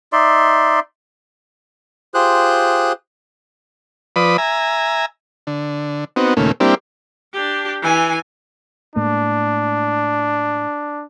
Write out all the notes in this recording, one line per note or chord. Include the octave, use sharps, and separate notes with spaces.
D#4 D5 E5 C6
F4 G4 G#4 C5 F#6
F3 B4 D5 B5 D#6
E5 G#5 A#5
D3
B3 C4 D#4 F#4
D#2 A#2 C#3 A3
G3 A#3 C4 D4 E4 G4
D4 G4
E3 G#5
A2 G#3 A#3 D4